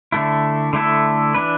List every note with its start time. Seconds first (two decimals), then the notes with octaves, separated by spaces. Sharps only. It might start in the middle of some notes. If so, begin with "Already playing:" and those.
0.12 D3 A3 E4
0.73 D3 A3 E4 A4
1.34 E3 D4 B4